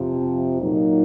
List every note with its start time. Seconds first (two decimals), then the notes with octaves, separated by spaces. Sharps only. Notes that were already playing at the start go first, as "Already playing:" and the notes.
Already playing: F2 C3 F3
0.60 A#2 F#3 A#3 D#4